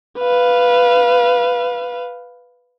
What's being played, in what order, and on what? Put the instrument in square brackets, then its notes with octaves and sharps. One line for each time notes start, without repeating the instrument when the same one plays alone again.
[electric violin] B4 F5